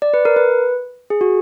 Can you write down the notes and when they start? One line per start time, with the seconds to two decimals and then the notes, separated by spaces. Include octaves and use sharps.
0.02 D5
0.14 B4
0.25 A#4
0.36 B4
1.10 G#4
1.21 F#4